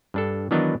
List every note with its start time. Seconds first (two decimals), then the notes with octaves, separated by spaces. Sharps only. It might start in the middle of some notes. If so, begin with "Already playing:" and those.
0.14 G2 D4 A4
0.51 D#3 E3 F#3 B3 D4 D#4